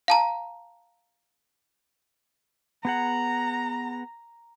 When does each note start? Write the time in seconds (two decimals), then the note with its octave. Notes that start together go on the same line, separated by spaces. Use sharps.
0.08 F5 A5 A#5
2.85 B3 G#4 F#5 A#5